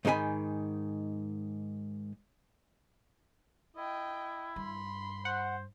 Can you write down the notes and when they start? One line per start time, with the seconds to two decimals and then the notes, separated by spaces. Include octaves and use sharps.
0.05 G#2 D#3 D#4 A#4 G#5 B5
3.76 E4 D#5 G5
4.56 G2 B5 C6
5.25 C5 F#5